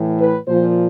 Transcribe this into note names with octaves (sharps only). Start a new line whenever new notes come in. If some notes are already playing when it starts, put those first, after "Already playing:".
Already playing: A2 E3
B4
A#2 F3 C5